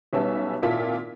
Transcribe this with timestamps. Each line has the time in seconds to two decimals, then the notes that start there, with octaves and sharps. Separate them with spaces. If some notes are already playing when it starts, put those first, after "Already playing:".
0.13 B1 G3 B3 C#4 E5 A5
0.62 G#1 A#2 E4 F4 A4 B6